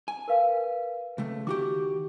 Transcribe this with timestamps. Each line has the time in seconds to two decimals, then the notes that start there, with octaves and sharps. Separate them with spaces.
0.08 G#5
0.28 A#4 B4 F5
1.18 C#2 A3
1.47 D#3 F#4 G4 D6